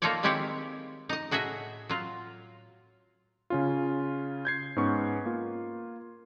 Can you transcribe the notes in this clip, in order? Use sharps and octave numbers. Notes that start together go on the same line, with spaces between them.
A#3 D#4 F4 A4 C#5 D5
D#3 G#3 C4 E4 G4 C#5
D#4 D#5
A2 F#4 G#4 D#5 E5
F#3 F4
C#3 C#4 F4
G6 G#6 C7
G#2 B3 C#4 C#6
A#3 F4